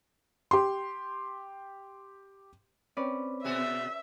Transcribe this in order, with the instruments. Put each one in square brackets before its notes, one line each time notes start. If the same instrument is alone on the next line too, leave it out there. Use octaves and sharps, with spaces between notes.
[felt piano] G4 C6
[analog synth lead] C4 [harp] C#4 B4 D5
[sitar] B2 F#4 G#4 [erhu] E5